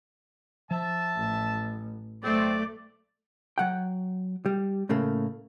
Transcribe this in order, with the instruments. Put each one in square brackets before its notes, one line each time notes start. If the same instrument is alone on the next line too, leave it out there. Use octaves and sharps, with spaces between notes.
[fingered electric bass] F3 [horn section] E5 A5
[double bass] A1
[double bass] B1 [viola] A3 D5 [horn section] C4
[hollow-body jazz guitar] F#3 F#5 G5
G3
A2 C#3 A3 A#3